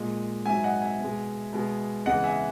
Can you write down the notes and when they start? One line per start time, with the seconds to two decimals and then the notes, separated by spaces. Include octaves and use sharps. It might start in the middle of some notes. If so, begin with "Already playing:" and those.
Already playing: A#2 G#3 D#5
0.46 G#2 F#3 E5 G#5
0.64 D#5 F#5
0.82 E5 G#5
1.00 B2 G#3
1.53 B2 G#3
2.06 E2 C#3 G#3 D#5 F#5
2.24 E5 G#5